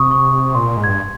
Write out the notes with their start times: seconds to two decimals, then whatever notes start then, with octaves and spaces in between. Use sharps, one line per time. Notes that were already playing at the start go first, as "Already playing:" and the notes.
Already playing: C3 C#6 D#6
0.11 C#6
0.55 A#2 C6
0.77 G#2
0.84 G#6
0.89 G2